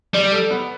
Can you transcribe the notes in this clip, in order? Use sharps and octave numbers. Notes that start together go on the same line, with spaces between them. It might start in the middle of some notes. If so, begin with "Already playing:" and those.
G3 D5
A4
B3